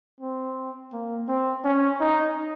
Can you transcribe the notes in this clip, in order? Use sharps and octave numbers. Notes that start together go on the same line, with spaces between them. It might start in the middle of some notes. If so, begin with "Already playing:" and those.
C4
A#3
C4
C#4
D#4